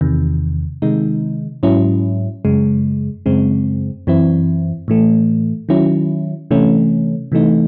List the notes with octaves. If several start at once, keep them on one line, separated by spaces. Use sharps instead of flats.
E2 C3 D#3
C3 D#3 G#3 D#4
G#2 F#3 C#4 E4
F#2 C#3 G#3
F#2 C#3 G#3 C4
F#2 E3 C4 E4
A2 E3 A3
D#3 F#3 C#4 E4
C3 E3 A3 C#4
C3 E3 A3 D#4